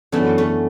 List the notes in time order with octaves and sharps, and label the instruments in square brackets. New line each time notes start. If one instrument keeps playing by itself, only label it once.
[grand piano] F#2 E3 B3 D4 A4 [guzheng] F#3 A3
[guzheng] A3 C#4